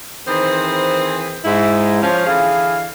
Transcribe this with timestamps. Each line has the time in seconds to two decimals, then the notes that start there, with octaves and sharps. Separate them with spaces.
0.27 D#3 E3 C4 G#4 B4 C5
1.45 G#2 E4
2.02 F3 C#4
2.26 D3 E3 G#4 F5